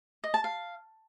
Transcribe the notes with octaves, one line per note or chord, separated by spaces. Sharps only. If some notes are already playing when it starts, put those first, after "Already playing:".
D#5
A5
F5